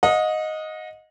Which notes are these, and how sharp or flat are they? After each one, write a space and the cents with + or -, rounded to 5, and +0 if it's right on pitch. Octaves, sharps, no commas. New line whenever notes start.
D#5 +0 F#5 -40